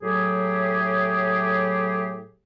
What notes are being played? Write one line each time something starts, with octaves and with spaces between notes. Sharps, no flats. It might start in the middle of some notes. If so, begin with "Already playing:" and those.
A2 F#3 G4 G#4